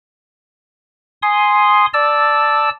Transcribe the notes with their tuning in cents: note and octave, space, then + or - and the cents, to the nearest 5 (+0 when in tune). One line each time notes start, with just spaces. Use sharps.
G#5 +0 C6 +0 D#6 +0
D5 +0 A5 +0 E6 +0